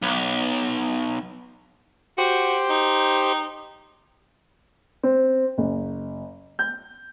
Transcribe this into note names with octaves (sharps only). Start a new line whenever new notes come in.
B1
F#4 G4 C5
D#4
C4
F#1
G6